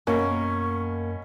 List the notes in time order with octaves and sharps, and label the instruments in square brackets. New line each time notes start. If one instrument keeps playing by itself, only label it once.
[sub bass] F#2 [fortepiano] B2 C#4 [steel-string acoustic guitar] A#3 [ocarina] C#6